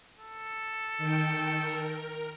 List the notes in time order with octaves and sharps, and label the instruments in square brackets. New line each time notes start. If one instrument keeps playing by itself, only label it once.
[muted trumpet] A4
[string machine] D#3 G5
A#4